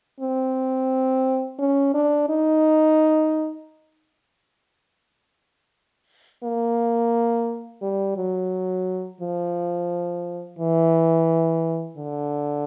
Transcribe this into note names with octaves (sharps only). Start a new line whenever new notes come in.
C4
C#4
D4
D#4
A#3
G3
F#3
F3
E3
D3